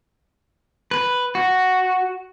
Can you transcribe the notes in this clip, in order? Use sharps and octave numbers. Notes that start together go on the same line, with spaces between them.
B4
F#4